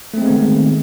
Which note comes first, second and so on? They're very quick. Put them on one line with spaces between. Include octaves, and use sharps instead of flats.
A3 C4 G#3 B3 D#3